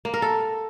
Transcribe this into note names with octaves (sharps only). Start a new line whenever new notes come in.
A#3
A#4
A4